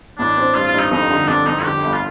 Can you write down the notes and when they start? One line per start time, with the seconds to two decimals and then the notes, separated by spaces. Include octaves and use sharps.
0.18 A1 D4
0.37 C4
0.55 G2 F4
0.67 F4
0.74 G2
0.80 D#4
0.91 F2 D#4
1.11 D3
1.28 F2 D4
1.47 F2 D#4
1.64 D3 G4
1.83 G1
1.93 F4